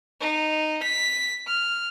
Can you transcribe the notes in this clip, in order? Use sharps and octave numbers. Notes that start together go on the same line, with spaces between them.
D#4
B6
F6